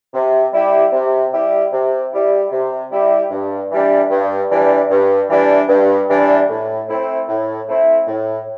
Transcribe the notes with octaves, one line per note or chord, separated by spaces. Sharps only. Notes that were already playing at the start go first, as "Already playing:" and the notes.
C3
G3 E4 G4
C3
G3 E4 G4
C3
G3 E4 G4
C3
G3 E4 G4
G2
E3 G3 D4
G2
E3 G3 D4
G2
E3 G3 D4
G2
E3 G3 D4
A2
A3 C4 E4
A2
A3 C4 E4
A2